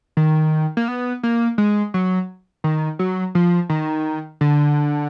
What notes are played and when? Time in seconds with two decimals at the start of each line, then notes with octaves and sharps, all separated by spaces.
0.17 D#3
0.77 A#3
0.88 B3
1.23 A#3
1.58 G#3
1.94 F#3
2.64 D#3
2.99 F#3
3.35 F3
3.69 D#3
4.41 D3